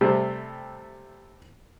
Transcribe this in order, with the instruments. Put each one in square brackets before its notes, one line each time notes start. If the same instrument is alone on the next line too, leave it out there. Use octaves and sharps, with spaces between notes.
[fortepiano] C3 G3 A3 C4